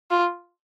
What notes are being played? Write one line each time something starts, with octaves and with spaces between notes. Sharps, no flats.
F4